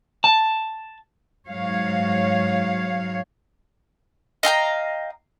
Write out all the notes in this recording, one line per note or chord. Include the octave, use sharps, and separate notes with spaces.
A5
G#2 F#3 C#5 F5
D#5 F5 G5 A#5